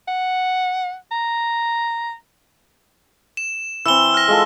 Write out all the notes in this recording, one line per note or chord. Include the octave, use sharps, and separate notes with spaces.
F#5
A#5
E7
E3 C4 E6 E7 G7
F6 A#6
G#3 F4 A4